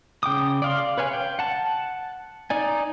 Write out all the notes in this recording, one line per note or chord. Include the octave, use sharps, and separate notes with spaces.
C#3 G5 D6 D#6
D5 F5 C6
B4 C#5 F5 G#5
G5
F#5 A5
D#4 D5 G#5